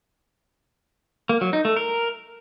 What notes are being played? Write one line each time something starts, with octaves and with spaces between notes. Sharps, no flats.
A#3
F#3
D#4
A3
A#4